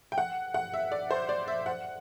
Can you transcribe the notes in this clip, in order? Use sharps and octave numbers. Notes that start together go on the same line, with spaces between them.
G5
F#5
F#5
E5
D5
C5
D5
E5
F#5